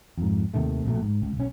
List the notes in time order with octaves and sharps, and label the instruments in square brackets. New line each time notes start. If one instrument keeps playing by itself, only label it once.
[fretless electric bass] F2 G#2
D#2 C3 D#3 A3
A#1 B2 A3
G#2
C#2
B1 C#4